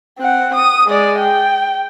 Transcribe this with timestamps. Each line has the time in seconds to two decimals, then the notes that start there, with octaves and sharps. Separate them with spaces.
0.19 C4 F#5
0.55 D#6
0.87 G#3 D5
1.19 G5